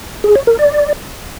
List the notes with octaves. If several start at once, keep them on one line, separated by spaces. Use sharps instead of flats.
G#4
C#5
A#4
D5